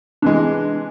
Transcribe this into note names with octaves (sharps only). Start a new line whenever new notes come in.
C3 E3 G#3 D4